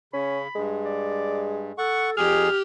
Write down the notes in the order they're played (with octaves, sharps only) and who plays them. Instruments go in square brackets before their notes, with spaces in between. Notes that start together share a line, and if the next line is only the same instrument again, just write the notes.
[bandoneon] C#3 [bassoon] C#4 [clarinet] B5
[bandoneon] G2 [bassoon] G#3
[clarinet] D5
[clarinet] A4 [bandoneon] F#5 C#6
[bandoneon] F2 G#4 [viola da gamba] G4 [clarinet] F6